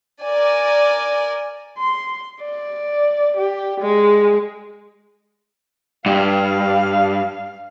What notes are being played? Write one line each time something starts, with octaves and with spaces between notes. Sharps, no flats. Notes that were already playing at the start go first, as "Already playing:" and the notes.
A#4 D5 G#5
C6
D5
G4
G#3
G2 F5